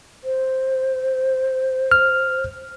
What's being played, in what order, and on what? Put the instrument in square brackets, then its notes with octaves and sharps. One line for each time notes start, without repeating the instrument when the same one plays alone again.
[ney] C5
[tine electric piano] F6